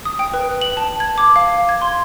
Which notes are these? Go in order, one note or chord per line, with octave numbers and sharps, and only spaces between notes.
D#6
G5
B4
F#7
A5
G#6
D6
F5
G#6
C6